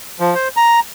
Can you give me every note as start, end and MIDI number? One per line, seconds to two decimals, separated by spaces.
0.20 0.34 53
0.35 0.48 72
0.57 0.80 82